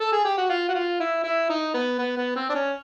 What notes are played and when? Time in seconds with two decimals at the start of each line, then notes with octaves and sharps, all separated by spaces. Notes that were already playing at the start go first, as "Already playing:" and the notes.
0.00 A4
0.12 G#4
0.25 G4
0.38 F#4
0.50 F4
0.69 F#4
0.75 F4
1.00 E4
1.24 E4
1.50 D#4
1.74 B3
1.99 B3
2.17 B3
2.36 C4
2.50 D4
2.55 C#4